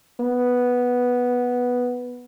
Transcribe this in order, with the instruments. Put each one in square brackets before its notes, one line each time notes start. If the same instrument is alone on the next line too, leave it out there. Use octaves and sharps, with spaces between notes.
[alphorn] B3